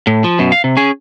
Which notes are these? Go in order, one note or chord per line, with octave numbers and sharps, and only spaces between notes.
A2
F3
F#2 B2
F5
C3
C#4 G#4